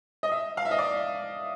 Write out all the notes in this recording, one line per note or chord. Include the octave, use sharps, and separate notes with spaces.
D#5
E5
F5
E5
D#5
D5